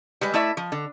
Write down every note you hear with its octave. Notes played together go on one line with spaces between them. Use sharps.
G3 G#3 B4
A3 E4 D5 E5
F3
D3